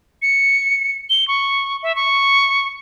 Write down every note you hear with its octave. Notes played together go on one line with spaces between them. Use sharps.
C#7
G7
C#6
E5
C#6